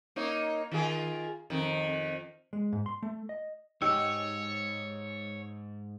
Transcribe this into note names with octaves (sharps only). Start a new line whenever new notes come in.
A#3 D#4 C#5
D#3 F4 G#4
F2 D#3
G#3
G#2
C6
A3
D#5
B1 G#2 D#4 G4 C#5 E6